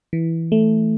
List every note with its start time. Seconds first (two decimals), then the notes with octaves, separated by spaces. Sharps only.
0.13 E3
0.52 A3